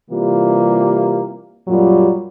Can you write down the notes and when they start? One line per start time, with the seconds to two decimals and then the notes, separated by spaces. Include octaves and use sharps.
0.11 C3 E3 G3 A#3 F4
1.67 F#2 A#2 F#3 G3 F4